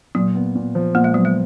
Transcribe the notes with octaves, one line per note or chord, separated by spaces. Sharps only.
A#2 F#3
B3
A#2
F3
A#2 A#3
G#3
F#3 B3
G#3